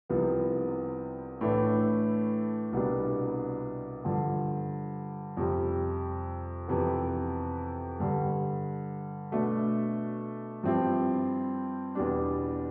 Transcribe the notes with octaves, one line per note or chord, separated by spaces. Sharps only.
C2 C3 F3 B3
A2 E3 A3 D4
C2 B2 G3 B3 D4
G2 D3 F3
F2 C3 G3
F2 C3 E3 B3
G2 D3 G3
B2 A3 D4
G2 F3 C4 E4 G4
E2 B2 G3 D4